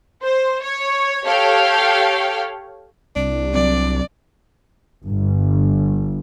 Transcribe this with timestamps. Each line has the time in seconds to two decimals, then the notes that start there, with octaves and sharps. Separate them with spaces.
0.23 C5
0.63 C#5
1.24 G4 A4 C#5 F5 G5
3.16 C2 D4
3.54 F#3 C4 D5
5.03 G1